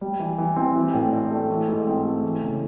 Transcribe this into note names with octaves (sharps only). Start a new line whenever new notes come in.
G3
E3
E3
C4
E3
A2
D4
A3
E3
G#2
C4
A3
E3
C#3